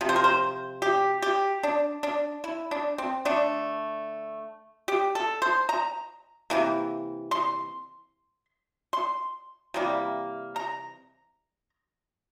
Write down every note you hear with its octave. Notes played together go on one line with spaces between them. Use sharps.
C3 F3
C5
A#4
C5
G4
G4
D4
D4
E4
D4
C4
D3 A3 D4
G4
A4
C5
A#5
C3 E3 A#3
C6
C6
C3 E3 G3 A#3
A#5